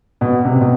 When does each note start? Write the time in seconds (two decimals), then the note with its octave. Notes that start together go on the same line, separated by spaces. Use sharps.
0.21 B2
0.45 C3
0.61 B2